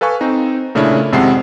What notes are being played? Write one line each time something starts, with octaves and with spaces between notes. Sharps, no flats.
A4 B4 F5 G#5 C#6
C4 D#4
A#2 C#3 A3 C#4 D4 E4
G#1 F2 C3 G#3 F#5 C7